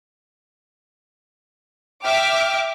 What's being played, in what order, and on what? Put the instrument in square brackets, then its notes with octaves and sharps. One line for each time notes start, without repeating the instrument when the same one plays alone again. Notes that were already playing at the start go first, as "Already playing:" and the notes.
[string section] E5 D6 F6 [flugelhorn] G5